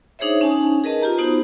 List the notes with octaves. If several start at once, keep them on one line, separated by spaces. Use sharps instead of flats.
D4 D#4 G#4 C5 C#5 E5
C#4 D#4 G#5 A5
G#4 A#4 B4 D#5 A5
F4 G4 A#5
B3 D#4 F#4 C5